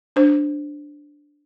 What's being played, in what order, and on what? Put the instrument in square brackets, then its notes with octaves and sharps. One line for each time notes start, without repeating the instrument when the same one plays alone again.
[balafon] D4 C5